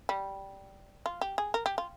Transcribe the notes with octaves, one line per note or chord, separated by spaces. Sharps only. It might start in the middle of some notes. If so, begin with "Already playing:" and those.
G3
F4
G4
G#4
A#4
G4
F4